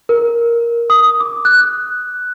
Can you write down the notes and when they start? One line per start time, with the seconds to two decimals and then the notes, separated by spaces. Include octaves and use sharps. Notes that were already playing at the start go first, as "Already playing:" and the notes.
0.09 A#4
0.90 D#6
1.20 D6
1.45 F#6